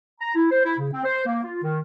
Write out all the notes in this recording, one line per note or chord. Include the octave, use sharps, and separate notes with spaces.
A#5
E4
C5
E4
C#3
C4
C5
A#3
F4
D#3